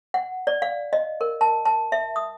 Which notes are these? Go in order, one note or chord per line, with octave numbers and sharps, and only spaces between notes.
F#5
D5
F5
D#5
A#4
A5
A5
E5
D#6